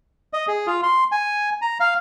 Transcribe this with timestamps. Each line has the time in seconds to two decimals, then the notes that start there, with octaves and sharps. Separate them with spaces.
0.33 D#5
0.48 G#4
0.67 F4
0.83 C6
1.12 G#5
1.62 A#5
1.80 F5